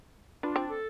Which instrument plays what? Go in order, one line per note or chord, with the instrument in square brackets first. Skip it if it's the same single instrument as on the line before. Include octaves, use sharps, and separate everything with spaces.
[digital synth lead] D4 [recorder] F4 [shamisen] B4
[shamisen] C4
[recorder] A4